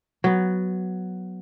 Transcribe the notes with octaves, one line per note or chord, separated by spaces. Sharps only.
F#3 B3